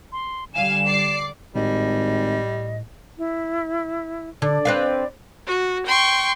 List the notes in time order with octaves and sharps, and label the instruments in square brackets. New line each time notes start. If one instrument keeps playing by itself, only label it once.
[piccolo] C6
[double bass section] D3 G3 [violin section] F5 G#5 [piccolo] E7
[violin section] D5 D6 C7
[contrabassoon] G#1 [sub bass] A2 [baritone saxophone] G3 [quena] D#5
[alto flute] E4
[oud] D3 [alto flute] D5
[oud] C4 B4 F5
[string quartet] F#4
G5 C6 C#6